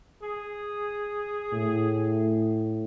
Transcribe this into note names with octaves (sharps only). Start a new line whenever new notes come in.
G#4
A2